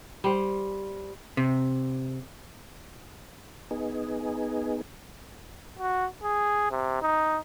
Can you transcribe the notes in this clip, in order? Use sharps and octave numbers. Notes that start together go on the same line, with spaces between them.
G3 C5
C3
B3 D#4 G#4
F#4
G#4
C3
D#4